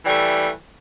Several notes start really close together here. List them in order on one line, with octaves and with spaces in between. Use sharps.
E3 G3 A3